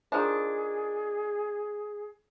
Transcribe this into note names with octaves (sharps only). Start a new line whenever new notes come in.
D#3 F3 D4 G#4